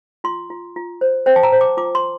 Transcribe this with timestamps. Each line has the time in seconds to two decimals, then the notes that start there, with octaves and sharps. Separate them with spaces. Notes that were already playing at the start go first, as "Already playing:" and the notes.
0.24 F4 C6
0.50 F4
0.76 F4
1.01 C5
1.26 C5 G5
1.36 A5
1.43 A#5
1.52 C5
1.61 D6
1.77 F4 D6
1.95 C6